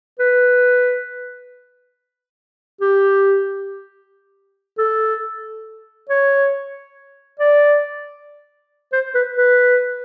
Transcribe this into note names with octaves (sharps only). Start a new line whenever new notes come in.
B4
G4
A4
C#5
D5
C5
B4
B4